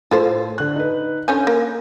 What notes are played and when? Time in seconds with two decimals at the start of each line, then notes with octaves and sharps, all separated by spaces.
0.11 A2 F4 A4 C5
0.58 D3 F#6
0.76 D#4 B4
1.28 D3 C#4 G#5 G6
1.47 A#3